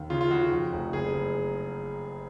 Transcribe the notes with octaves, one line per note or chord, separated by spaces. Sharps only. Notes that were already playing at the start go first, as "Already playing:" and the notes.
Already playing: D#2
C#3 F4
F4
C#3 F#4
F#4
F2
F1
F#1 G#4
F#1